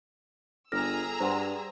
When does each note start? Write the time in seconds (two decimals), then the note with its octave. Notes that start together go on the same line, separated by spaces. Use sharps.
0.72 G1 G#4 A4 A#5 E6 F6 A#6
1.20 G2 C5 F#5 C6